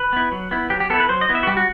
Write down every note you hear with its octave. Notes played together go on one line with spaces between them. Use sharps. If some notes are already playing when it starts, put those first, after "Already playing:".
Already playing: B4
B3 E4
F#3
B3 E4
F#3 G4
G4
B3 E4 A4
B4
F#3 C5
D#5
B3 E4
E5
F#4
G3 G4
F#4